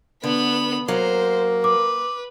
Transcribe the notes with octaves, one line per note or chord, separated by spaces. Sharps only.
D3 B3 B5
F#3 A#3 C5
B4 D6